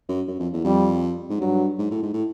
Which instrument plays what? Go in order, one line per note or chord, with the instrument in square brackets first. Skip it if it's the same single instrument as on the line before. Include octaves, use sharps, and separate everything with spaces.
[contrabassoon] F#2
F#2
F2
E2
[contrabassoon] F2 [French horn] G3
[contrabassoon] G#2
[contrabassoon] G2 [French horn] F#3
[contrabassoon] G#2
A2
G#2
A2